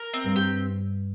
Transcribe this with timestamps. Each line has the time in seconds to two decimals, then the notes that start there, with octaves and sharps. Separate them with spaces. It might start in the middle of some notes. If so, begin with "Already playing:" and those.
Already playing: A#4
0.14 C4
0.24 G2
0.36 G4